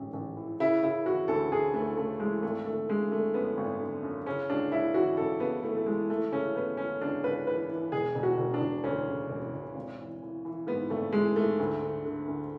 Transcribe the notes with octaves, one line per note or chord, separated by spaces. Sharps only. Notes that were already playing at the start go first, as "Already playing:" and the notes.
Already playing: A1 G#2
A1
E3
C#3 E4
C#3 E4
E3 F#4
D2 A4
D2 G#4
D2 A3
C#3 A3
E3 G#3
G#1 A3
D3 A3
D3 G#3
G#1 A3
F#2 B3
G#1
D3
F#2
C#3 C#4
C#2 D4
C#2 E4
E3 F#4
C#2 A4
C#3 B3
E3 A3
A3
E3 G#3
E3 A3
C#3 C#4
E3 B3
C#2 C#4
C#2 D4
C#2 B4
E3 B4
E3
E1 G#4
E1
F#4
E1
D4
E1
D2 C#4
C#3
E1
E1
G#1
E3
E3
E3
G#2 B3
G#1 A3
E3 G#3
G#2 A3
D2
D3
D3
D2